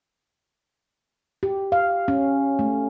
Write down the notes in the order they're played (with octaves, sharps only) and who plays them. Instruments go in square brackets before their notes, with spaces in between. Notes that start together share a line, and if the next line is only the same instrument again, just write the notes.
[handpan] G4
F5
C#4
A3